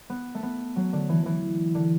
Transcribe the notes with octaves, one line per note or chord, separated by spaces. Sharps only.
B3
A3
B3
F#3
D3
E3
E3
D3